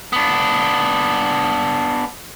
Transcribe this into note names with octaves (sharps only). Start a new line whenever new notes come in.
B3 D4